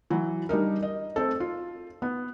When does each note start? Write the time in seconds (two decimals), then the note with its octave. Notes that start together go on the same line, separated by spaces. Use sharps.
0.10 E3 F#3
0.49 G3 D4 D#4 A#4
0.82 D#5
1.16 A3 C4 A4
1.40 F4
2.02 B3